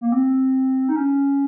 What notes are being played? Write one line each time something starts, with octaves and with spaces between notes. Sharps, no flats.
A#3
C4
D#4
C#4